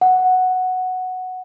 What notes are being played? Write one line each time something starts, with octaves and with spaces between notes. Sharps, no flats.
F#5